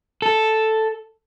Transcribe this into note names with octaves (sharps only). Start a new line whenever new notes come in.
A4